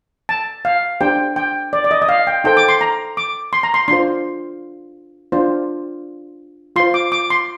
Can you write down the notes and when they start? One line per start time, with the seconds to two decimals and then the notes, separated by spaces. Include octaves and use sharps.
0.29 A5
0.65 F5
1.01 D4 G4 C5 G5
1.36 G5
1.73 D5
1.84 D5
1.91 D#5
2.02 D#5
2.09 F5
2.27 G5
2.44 D#4 A4 C5 G5
2.57 D6
2.69 C6
2.81 A#5
3.17 D6
3.53 C6
3.63 A#5
3.74 C6
3.88 D4 F4 C5 C6
5.32 D4 F4 C5
6.76 F4 C6
6.80 C5
6.94 D6
7.12 D6
7.30 C6